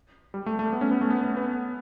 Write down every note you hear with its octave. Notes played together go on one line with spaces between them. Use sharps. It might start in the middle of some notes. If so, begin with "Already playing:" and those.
G3
A3
A3
B3
C#4
B3
A3
B3
B3
B3